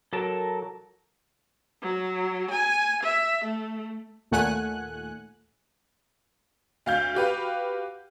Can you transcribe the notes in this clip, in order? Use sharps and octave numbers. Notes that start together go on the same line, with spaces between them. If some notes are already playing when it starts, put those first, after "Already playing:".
F#3 A4 A#4 A5
F#3
G#5
E5
A3
D#2 A#2 A3 F#5 G#5 F#6
D2 F5 G6
F#4 G4 B4 F5